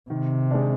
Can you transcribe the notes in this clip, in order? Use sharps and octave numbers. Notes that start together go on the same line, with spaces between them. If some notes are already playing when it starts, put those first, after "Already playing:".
C3 D#3
G#3 D4